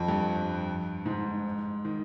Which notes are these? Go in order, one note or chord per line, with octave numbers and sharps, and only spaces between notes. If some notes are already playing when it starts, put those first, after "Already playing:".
Already playing: F2
G2
G#2
D#3